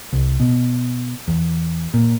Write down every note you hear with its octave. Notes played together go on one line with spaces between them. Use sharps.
C2
B2
E2
A#2